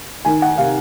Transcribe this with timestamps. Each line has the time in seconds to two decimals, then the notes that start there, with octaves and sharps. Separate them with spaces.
0.25 D#3 G#5
0.42 F#5
0.58 C3 F5